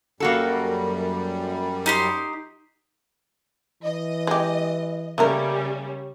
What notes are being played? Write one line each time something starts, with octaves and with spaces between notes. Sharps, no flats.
F#2 G3 A#3 F#4 A4
D#4 G4 C6
E3 D#5
G#3 G4
C#3 G3 A3 A#3 C#4 A#4